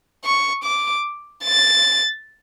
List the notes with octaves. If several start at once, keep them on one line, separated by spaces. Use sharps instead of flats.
C#6
D6
A6